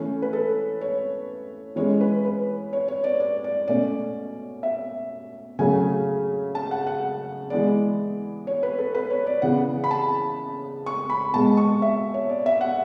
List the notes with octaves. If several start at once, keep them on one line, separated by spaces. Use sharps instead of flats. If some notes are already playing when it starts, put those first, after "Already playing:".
Already playing: E3 A3 C#4
B4
A4
C#5
E3 G#3 C#4 C#5
B4
B4
C#5
C#5
D5
D5
D5
B2 A3 C#4 D5
E5
C#3 F#3 A3 C#4 G#5
A5
F#5
F#5
E3 G#3 B3 D5
C#5
B4
A4
B4
C#5
D5
C#3 E3 B3 F#5
B5
A5
C#6
B5
B2 G#3 B3 A5
C#6
E5
C#5
D5
E5
F#5